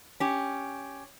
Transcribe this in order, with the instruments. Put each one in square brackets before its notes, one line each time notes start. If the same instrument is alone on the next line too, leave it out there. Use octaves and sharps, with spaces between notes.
[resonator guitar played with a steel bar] C#4 G4